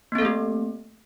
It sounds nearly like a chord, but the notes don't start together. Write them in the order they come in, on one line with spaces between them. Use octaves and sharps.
A#3 C4 A4 A3 G4